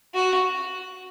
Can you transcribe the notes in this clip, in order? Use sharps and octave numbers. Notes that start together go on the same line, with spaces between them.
F#4